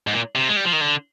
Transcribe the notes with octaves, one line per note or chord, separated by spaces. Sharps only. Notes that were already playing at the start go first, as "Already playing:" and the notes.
G#2
A#2
C3
G#3
G3
F3
D#3
D3